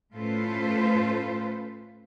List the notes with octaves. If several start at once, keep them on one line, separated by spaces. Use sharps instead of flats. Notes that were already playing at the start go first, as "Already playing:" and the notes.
A2 C#4 F4 A4 B4 C5